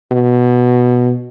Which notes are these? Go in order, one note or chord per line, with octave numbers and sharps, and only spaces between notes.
B2